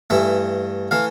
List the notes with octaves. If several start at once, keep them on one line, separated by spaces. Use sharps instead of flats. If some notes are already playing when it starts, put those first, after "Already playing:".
G2 E3 A3 E5
E3 A3 F5